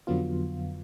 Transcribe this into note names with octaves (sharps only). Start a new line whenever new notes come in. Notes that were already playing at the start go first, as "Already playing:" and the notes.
F2 D3 F#3 B3 F4